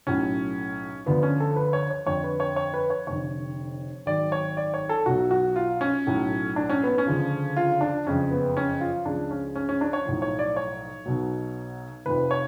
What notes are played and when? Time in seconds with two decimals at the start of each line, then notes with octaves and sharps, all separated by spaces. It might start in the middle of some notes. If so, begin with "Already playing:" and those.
0.07 B1 A2 F#3 C#4
1.06 D2 D3 F3 B3
1.23 C#4
1.40 A4
1.56 B4
1.73 C#5
1.91 C#5
2.06 F2 D3 F3 C#5
2.24 B4
2.40 C#5
2.56 C#5
2.74 B4
2.90 C#5
3.07 F1 F2 D3 C#5
4.06 G#1 G#2 F#3 D5
4.32 C#5
4.57 D5
4.74 C#5
4.89 A4
5.06 B1 B2 F#3 F#4
5.31 F#4
5.56 F4
5.81 C#4
6.07 B1 A2 F#3
6.56 D4
6.70 C#4
6.84 B3
6.98 C#4
7.07 D2 C#3 F3
7.56 F4
7.81 D4
8.05 F#1 F2 C#3 F3 C#4
8.31 B3
8.57 C#4
8.81 F4
9.06 C#2 C#3 F3 D4
9.31 C#4
9.56 C#4
9.69 C#4
9.81 D4
9.93 C#5
10.05 B1 A2 F3
10.22 C#5
10.39 D5
10.56 C#5
11.06 B1 B2 F#3
12.06 F1 F2 F3 B4
12.31 C#5